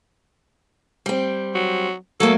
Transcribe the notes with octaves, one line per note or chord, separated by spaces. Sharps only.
G3 C4
F#3
F#3 A3 A#3 A4